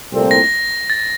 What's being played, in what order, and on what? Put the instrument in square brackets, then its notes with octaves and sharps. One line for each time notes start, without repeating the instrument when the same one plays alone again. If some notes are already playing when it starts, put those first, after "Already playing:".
[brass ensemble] C2 A#2 A3 C4
[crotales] A#6
A6